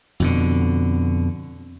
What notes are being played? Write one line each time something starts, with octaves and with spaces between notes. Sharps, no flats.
F2 B2 D3